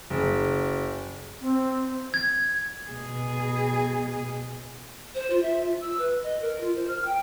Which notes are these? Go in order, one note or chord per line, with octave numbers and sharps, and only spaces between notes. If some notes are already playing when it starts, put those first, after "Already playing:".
F#1
C4
G#6
B2 G#4
C5
F4
E5
F4
E6
B4
D#5
A#4
F4
C5
F6
G5